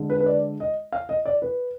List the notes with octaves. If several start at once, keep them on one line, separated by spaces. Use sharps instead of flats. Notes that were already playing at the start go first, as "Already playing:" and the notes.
Already playing: D3 G#3
B4
B4
D5
D#5
F5
D#5
D5
B4